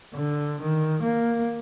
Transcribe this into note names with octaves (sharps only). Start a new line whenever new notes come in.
D3
D#3
A#3